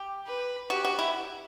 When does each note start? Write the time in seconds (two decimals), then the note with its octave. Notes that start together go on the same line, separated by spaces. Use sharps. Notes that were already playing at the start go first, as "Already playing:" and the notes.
Already playing: G4
0.27 B4
0.70 F#4 G4
0.84 F#4
0.99 E4